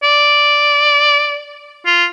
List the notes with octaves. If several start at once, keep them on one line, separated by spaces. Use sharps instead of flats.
D5
F4